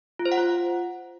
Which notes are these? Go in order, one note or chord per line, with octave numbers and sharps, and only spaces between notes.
F4
C5
F#5
F4